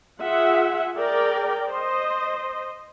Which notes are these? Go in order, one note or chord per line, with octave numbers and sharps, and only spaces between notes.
F4 G#4 E5 F#5
G#4 A#4 D5 G5
C5 D#5